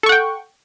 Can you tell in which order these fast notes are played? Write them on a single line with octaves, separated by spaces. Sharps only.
A4 C#6 F#5 G5